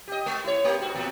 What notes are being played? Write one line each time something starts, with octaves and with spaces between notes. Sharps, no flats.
G4 D#5
G#3
E4 C#5
A3 A#3 G4
G#2 F#4
E2 A#2 F#4